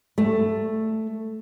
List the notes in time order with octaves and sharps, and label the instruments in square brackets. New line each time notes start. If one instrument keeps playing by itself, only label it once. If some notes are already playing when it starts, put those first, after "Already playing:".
[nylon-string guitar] A3